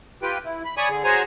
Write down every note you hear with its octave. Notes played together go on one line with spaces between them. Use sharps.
F4 G4 B4 G5
E4
B5
C#5 D5 G#5 B5 C#6 D#6
D3 G#4
F#4 G#4 C5 C#5 G#5 A#5